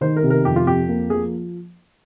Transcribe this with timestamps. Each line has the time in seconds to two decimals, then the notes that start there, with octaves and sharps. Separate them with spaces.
0.01 D#3 C5
0.16 A#4
0.23 C3
0.30 A#4
0.45 F2 G4
0.56 F4
0.67 F2 G4
0.88 A#3
1.10 F3 G#4